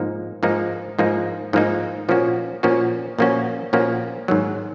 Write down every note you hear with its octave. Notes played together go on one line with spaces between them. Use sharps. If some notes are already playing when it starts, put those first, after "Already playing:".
Already playing: G#2 F3 A#3 D#4
G#2 F3 A#3 D#4
G#2 F3 A#3 D#4
G#2 F3 A#3 D#4
A#2 F3 A#3 C#4 F#4
A#2 F3 A#3 C#4 F#4
A#2 F3 A#3 C#4 F#4
A#2 F3 A#3 C#4 F#4
G#2 D#3 F#3